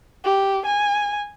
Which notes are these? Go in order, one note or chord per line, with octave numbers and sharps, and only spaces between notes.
G4
G#5